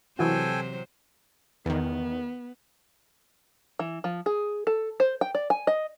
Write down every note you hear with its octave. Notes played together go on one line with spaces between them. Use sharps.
C3 E3 F#3 F#4 A4 C5 G5 G#5
E2 D#3 B3
E3
F3
G#4
A4
C5
G5
D5
G#5
D#5